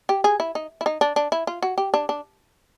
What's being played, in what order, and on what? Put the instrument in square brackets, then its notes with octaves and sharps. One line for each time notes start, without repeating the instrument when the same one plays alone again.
[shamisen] G4
G#4
E4
D#4
E4
D#4
D4
D4
E4
F4
F#4
G4
D4
D4